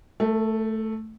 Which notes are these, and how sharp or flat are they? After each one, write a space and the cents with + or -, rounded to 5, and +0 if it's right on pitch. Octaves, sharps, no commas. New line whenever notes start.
A3 +0 A#4 -40